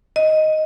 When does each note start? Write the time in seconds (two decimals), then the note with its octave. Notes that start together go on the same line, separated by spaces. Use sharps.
0.16 D#5